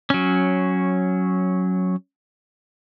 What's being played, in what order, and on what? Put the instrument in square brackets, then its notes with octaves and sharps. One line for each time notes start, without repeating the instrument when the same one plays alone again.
[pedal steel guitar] F#3 C#4